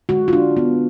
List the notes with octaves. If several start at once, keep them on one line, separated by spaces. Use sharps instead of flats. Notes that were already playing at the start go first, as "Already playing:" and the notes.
D3 G#3 F#4
F4
D4
B3